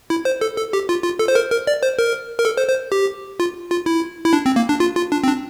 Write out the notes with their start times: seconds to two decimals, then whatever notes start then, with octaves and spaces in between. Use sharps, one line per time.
0.10 E4
0.25 C5
0.41 A4
0.57 A4
0.73 G4
0.89 F4
1.04 F4
1.19 A4
1.28 C5
1.35 A#4
1.51 A#4
1.67 D5
1.83 C5
1.99 A#4
2.39 A#4
2.45 A4
2.57 C5
2.69 C5
2.92 G4
3.40 F4
3.71 F4
3.86 E4
4.25 E4
4.33 D4
4.46 C4
4.56 A#3
4.69 D4
4.80 F4
4.96 F4
5.12 D4
5.24 C4
5.27 D4